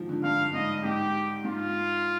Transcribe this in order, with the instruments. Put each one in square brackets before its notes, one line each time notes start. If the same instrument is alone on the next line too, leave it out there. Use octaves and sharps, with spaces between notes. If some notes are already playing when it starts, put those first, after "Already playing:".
Already playing: [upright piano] G#2 D#3 F3
D3
[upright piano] G2 [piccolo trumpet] F5
[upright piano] G#2 [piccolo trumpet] D#5
[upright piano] G#2 [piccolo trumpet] G4
[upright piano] G#2 [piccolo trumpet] F4